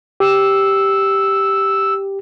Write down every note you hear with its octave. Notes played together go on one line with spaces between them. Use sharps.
G4 E6